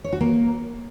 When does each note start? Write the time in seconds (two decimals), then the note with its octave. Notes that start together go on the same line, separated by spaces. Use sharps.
0.04 C#5
0.13 F#4
0.21 A#3